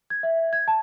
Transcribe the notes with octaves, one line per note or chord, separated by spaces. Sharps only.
G#6
E5
G#6
A5